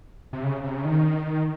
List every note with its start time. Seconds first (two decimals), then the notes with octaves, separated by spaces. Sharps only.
0.33 C3
0.43 C#3
0.64 C3
0.76 C#3
0.85 D#3